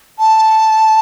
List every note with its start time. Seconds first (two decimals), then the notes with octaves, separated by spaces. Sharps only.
0.19 A5